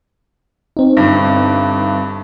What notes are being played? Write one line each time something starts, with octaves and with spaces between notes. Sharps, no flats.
C4 D#4
G1 G2